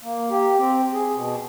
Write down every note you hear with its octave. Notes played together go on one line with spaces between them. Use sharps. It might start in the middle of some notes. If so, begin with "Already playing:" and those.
A#3
G4
C4
G#4
B2